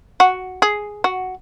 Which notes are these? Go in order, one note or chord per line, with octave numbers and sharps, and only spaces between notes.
F#4
G#4
F#4